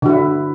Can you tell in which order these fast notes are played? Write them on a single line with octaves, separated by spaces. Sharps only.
D3 F#4 E4